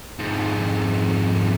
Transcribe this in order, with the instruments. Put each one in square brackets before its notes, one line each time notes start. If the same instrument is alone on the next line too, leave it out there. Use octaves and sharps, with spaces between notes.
[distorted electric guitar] F2 G#2